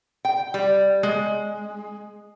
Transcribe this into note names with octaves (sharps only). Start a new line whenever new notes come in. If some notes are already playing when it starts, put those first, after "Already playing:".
G5
G3
G#3